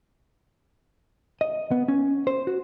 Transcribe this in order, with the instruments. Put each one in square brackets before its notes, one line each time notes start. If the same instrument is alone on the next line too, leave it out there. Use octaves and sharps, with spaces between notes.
[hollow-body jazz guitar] D#5
B3
C#4
C5
F#4